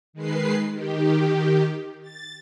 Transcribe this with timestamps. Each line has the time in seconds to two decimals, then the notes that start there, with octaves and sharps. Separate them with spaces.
0.13 D#3 G#3 B4 C7
0.71 D#3 G4
2.02 A6